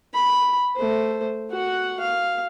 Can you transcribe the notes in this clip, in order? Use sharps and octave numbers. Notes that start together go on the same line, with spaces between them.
B5
A3 C5
F#4 F#5
F5